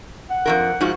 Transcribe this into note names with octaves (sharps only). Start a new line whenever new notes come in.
F#5
F2 C#3 A#4
G#2 F3 F#4